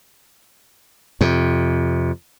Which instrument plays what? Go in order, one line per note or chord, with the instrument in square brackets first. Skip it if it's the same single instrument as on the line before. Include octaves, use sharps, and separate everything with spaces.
[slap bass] F2 C3